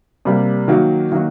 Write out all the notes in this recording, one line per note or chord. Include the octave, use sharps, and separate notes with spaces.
C3 G3 A#3
D#3 F#3 A#3 D#4 F#4
D#3 F#3 A#3 D#4 F#4